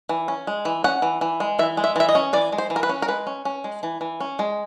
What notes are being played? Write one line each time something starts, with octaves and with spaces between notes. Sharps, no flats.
E3
C#4
G#3
E3
C#4 F#5
E3
E3
G#3
E3 E5
G#3
E5
E3 E5
D#5
C#4
E3 D5
G#3
C5
E3
A#4
B4
C#4
A#4
G#3 B4
C#4
C#4
G#3
E3
E3
C#4
G#3